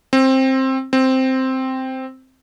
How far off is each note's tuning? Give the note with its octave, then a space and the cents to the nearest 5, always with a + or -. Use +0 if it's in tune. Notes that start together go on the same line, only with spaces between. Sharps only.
C4 +15
C4 +0